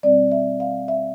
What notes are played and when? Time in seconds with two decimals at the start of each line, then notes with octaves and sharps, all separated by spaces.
0.03 B2 G3 C4 D5
0.31 E5
0.60 F5
0.88 E5